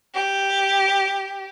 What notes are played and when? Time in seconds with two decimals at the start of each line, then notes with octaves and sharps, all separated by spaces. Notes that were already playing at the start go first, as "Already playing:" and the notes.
0.15 G4